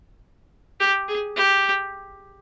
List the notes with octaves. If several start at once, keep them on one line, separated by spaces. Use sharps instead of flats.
G4
G#4
G4